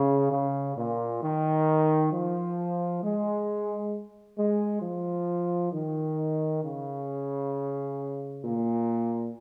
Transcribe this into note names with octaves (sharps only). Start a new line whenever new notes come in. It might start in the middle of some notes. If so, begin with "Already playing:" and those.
Already playing: C#3
C#3
A#2
D#3
F3
G#3
G#3
F3
D#3
C#3
A#2